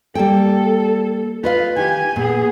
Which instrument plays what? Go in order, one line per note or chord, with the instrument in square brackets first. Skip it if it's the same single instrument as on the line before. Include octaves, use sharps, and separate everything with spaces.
[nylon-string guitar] G3 A#3 G5 [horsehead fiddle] A4
[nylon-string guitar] F4 D#5 F5 [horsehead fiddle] B4
[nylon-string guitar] D#3 [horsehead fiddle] G4 G#5
[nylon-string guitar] A#2 [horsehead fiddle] B3 G#4